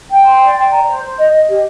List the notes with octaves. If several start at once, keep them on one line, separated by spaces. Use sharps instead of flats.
G5
C6
D5
G5
A#5
C5
C5
D#5
D#5
G4